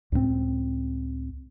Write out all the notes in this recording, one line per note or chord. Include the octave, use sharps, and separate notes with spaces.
C#2 A2 A3 C4